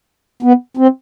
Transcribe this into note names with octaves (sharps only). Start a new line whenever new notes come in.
B3
C4